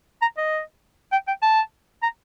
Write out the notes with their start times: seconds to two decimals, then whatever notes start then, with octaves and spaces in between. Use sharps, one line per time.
0.22 A#5
0.38 D#5
1.12 G5
1.28 G5
1.43 A5
2.03 A#5